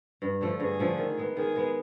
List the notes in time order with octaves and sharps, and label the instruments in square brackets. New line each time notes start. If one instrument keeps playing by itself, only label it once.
[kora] G2
D3 F3 A3
[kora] G2 [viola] G#4
[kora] D3 F3 A3
D#3
G#3 B3
[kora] D#3 [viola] G#4
[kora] G#3 B3